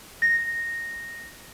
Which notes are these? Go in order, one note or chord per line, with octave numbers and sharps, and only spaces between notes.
A#6